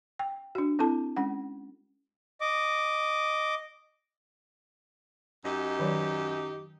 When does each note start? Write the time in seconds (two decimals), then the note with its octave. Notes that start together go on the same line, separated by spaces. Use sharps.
0.19 G5
0.55 D4 F#4
0.79 C4 E4 A4 A5
1.16 G#3 C#4 F#5
2.41 D#5 D6
5.45 F#2 D#4 G4 D#5
5.79 D#3 F#3 D5